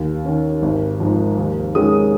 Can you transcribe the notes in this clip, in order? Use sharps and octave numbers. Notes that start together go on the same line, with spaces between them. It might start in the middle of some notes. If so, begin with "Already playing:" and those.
Already playing: D#2
D#3 C#4
G#1
G#2 F3
D#2
D#3 G#3 C#4 D#6